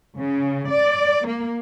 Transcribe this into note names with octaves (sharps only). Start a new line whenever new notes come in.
C#3
D5
A#3